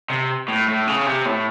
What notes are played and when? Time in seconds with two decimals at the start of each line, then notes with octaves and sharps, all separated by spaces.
0.10 C3
0.48 A2
0.68 A2
0.87 C#3
1.06 C3
1.26 A2